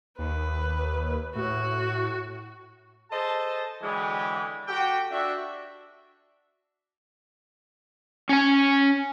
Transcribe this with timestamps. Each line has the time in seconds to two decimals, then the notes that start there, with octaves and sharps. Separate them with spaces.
0.19 D#2 B4
1.35 A2 F#4
3.11 G#4 A4 C5 D#5 A5
3.82 D3 E3 F#3 G#3 G4 G#4
4.68 F#4 G4 A4 G5
5.11 D4 F#4 E5
8.29 C#4 G#5